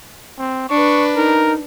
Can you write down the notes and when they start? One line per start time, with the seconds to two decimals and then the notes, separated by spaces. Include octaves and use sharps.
0.38 C4
0.69 D4 B4 C#6
1.16 D#4 A#4